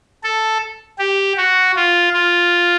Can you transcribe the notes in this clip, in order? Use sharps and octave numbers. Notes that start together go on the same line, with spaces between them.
A4
G4
F#4
F4
F4